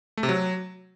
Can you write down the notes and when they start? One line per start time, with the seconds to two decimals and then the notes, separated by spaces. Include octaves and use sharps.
0.17 A3
0.23 C3
0.29 F#3